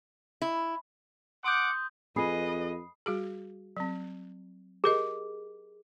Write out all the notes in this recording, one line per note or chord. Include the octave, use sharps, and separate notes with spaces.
E4
F#5 C6 D6 D#6 G6
F2 G#4 B4 D#5 B5 D#6 C7
G3 F#4 G#4
F#3 C4
G4 G#4 A#4 D#5